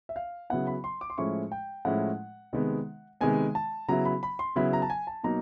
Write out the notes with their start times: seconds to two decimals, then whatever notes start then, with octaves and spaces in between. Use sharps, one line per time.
0.09 E5
0.16 F5
0.50 C#3 F#3 B3 E4 F#5
0.67 B5
0.84 C6
1.01 D6
1.10 C6
1.18 A2 F3 G#3 C#4 E4 C#6
1.52 G5
1.85 A2 F3 G#3 C#4 E4 F#5
2.53 C3 D#3 G#3 B3
3.21 C3 D#3 G#3 B3 G#5
3.55 A5
3.88 C#3 F#3 B3 E4 A#5
4.05 B5
4.23 B5
4.39 C6
4.56 C#3 F#3 B3 E4 B5
4.73 A#5
4.82 A5
4.90 G#5
5.07 A5
5.23 B2 F#3 A#3 D#4 A#5